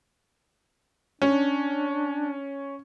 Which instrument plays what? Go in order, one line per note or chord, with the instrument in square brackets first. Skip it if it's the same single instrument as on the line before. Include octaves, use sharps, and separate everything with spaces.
[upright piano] C#4 [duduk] D4